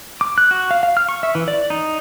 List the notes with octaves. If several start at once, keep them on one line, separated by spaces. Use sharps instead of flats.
D6
F#6
F#4
F5
F5
F6
C#6
E5
E3
D5
D#4